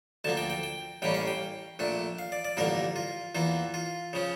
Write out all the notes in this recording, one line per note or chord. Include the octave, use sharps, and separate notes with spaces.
D2 D3 F3 A#3 A5
G5
G5
G5
A1 A2 G3 A#3 C#4 G5
F5
G5
A#1 A#2 A3 D4
F5
D5
D5
A1 G2 D3 F3 A#3 A#4
F4
E2 E3 A#3 F4
F4
C#3 F3 C#4